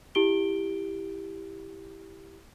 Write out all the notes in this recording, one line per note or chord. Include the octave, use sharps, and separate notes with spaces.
E4 G4 D7 G7